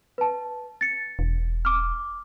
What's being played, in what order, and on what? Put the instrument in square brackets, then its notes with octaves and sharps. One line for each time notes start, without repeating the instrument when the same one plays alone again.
[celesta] B4 A5
A6 C#7
[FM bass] E1
[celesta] D6 F6